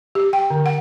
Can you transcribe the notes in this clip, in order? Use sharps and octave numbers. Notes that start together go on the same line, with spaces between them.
G4
G5
D3
F#5